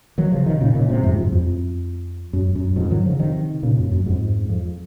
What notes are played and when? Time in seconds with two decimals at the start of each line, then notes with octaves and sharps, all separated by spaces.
0.18 D#3 F#3
0.32 C#3 F3
0.46 C3 D#3
0.61 A#2 C#3
0.75 A#2 C#3
0.89 G#2 C3
1.03 F2 G#2
1.18 F#2
1.32 F2
2.33 F#2
2.55 F#2
2.76 F2 G#2
2.91 D#3 F#3
3.05 C#3 F3
3.19 C3 D#3
3.63 A#2 C#3
3.77 F#2
3.91 F#2
4.06 F2 G#2
4.49 F2